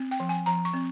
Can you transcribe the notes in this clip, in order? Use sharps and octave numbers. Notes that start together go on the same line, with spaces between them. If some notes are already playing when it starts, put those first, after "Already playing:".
Already playing: C4
G5
F3
G#5
F3 A#5
C#6
C4